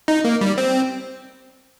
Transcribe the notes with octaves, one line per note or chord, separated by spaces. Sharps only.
D#4
A#3
G3
C4